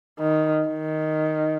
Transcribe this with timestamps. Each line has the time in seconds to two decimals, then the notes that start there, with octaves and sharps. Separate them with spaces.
0.19 D#3
0.67 D#3